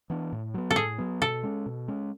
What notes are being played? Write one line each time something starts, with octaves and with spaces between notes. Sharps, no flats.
E3 B3 D4
A2
F#3 B3
A4
A2 G#4
F#3 B3
B2 A4
G#3 C#4
B2
G#3 C#4